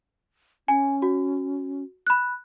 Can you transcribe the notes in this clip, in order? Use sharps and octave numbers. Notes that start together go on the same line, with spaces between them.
C#4 G#5
F#4
B5 F#6